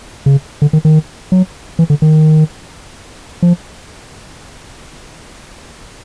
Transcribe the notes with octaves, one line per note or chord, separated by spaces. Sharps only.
C#3
D3
D#3
D#3
F#3
E3
D3
D#3
F3